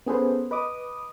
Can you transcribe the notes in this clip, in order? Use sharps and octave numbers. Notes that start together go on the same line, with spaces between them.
B3 C#4 G#4 A4 B4 C5
B4 D#5 D6 D#6